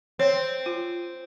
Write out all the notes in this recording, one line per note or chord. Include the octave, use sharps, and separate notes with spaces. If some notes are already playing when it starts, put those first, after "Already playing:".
C4 C#5
F4